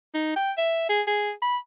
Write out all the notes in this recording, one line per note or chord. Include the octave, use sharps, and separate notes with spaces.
D#4
G5
E5
G#4
G#4
B5